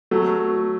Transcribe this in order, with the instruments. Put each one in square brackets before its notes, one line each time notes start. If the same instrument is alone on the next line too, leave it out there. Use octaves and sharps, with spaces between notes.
[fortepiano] F#3 A3